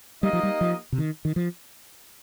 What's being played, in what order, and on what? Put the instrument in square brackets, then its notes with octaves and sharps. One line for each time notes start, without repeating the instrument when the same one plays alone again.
[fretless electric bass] G3 [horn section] A#3 D#4 G4 D#5
[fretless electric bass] F3
G3
F3
C3
D#3
D#3
F3